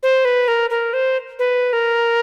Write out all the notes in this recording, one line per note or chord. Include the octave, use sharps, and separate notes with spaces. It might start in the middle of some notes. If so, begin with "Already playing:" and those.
C5
B4
A#4
A#4
C5
B4
A#4